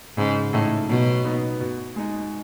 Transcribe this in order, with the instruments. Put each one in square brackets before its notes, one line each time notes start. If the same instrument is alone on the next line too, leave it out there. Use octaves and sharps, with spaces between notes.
[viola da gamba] G#2 [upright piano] C#3
[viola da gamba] A2 [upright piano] E3 A3 D#4 A4
[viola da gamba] B2 [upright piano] F#3
[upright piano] B3 D#4
B2
G#3 D#4